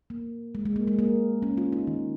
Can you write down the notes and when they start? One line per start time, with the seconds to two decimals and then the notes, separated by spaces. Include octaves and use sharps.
0.10 A#3
0.55 G#3
0.65 G#3
0.76 A#3
0.87 G#3
0.99 A#3
1.42 C#4
1.57 F4
1.73 D#4
1.87 D#3